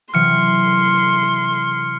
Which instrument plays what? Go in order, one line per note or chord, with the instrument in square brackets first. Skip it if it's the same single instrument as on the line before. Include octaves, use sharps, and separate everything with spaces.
[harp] C3 E3 F#3 [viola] C6 [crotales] F6 C#7